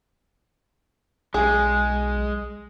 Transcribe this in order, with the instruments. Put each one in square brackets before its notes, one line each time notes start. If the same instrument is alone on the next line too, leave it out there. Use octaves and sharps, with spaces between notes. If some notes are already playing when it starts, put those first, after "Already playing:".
[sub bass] B1 [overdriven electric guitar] G#3 [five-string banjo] G#4